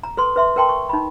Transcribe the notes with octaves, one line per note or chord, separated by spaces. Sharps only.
A#5
A4 B4 C6
B4 E5 C6
A#4 B4 G5 A5 C6
C#6
D#4 B5